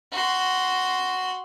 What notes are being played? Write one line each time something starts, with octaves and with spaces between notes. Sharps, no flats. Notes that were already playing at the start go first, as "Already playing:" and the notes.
F#4 C6